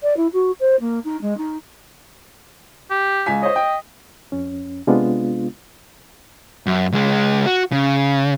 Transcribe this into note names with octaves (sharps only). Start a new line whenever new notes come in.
D5
E4
F#4
C5
A#3
D#4
G#3
D#4
G4
C#2 G#5 B6
C5 C#5 D#5
G5
F2 C#4
C3 G#3 B3 D4 F4
F#2
C#2 G#3
F#4
C#3